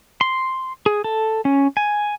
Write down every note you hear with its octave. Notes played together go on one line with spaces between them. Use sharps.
C6
G#4
A4
C#4
G#5